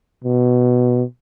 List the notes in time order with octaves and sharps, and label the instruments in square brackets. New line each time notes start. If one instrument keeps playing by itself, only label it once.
[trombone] B2